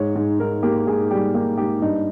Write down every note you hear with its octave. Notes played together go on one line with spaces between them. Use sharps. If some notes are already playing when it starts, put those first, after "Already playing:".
Already playing: G#2 C#5
G#2
G#2 A#4
A#3 G4
G#2 G#4
G3 G4
A#3 G4
G#2 G4
G2 D#4